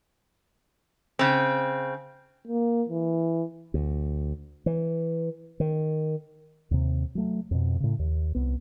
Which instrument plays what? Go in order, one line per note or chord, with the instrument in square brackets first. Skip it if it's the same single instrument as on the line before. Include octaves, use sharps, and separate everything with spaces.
[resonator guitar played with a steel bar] C#3 C4
[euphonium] A#3
E3
[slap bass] D2
E3
D#3
[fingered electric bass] D#2 C3
F#3 A3
F2 B2
A2 C#3
D#2
C2 B3